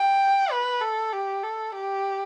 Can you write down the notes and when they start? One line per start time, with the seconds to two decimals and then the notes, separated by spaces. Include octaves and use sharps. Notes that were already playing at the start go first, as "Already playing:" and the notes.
Already playing: G5
0.51 B4
0.82 A4
1.13 G4
1.43 A4
1.75 G4